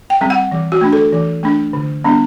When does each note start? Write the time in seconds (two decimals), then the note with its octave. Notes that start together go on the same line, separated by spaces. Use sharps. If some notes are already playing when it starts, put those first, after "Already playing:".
0.10 G5
0.21 G3 C4
0.30 F#5
0.52 E3
0.72 F#4
0.81 A3 D4
0.93 A4
1.13 E3
1.43 A3 D4
1.73 D3
2.04 G3 B3 D4